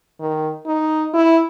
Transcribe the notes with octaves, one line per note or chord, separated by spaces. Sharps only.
D#3
D#4
E4